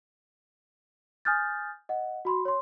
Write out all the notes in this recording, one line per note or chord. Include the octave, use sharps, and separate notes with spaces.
G#5 D#6 F6 G6 A6
D#5 F#5
F#4 B5 C6
C#5 C6